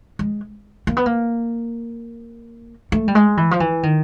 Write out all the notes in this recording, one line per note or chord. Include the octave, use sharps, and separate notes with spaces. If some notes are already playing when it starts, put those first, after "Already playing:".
G#3
A#3
B3
A#3
A3
G3
G#3
E3
F3
E3
D#3